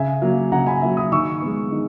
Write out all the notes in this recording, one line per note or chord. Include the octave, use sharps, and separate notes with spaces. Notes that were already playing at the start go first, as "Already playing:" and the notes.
Already playing: C#3 E5 G#5
F#3 A#3
C#3 F#5 A#5
G#5 B5
F#3 A#3 E5
B5 D#6
D#3 C#6 E6
G#3 B3
D#3